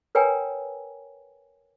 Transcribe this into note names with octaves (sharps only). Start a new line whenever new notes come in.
A#4 B4 C#5 G5 G#5 A#5